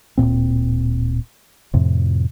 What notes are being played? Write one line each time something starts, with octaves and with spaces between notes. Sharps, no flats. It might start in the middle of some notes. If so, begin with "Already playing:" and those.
D1 C2 A#2 C4
F2 A2 C3